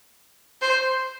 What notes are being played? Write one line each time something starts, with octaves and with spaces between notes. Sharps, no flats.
C5